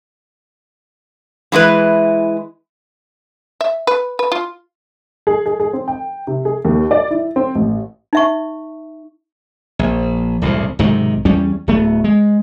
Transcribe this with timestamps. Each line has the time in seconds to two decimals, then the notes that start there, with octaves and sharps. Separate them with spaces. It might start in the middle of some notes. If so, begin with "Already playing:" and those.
1.52 E3 G#3 E4 B4
3.61 E5
3.87 B4
4.19 B4
4.32 F4
5.27 G#4
5.46 G#4
5.60 G#4
5.73 C4
5.88 G5
6.27 C3
6.45 G#4
6.65 D#2
6.91 D5
7.11 E4
7.36 C4
7.55 A1
8.13 D#4 E5 C#6
9.79 A#1
10.42 E1 C2 A2
10.79 B1 G#2 C3 D#3
11.25 E2 G3 C#4
11.67 D1 A3 B3
12.04 G#3